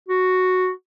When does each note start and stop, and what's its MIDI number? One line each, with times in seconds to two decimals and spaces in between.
0.08 0.70 66